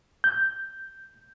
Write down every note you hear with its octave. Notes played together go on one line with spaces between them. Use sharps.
G6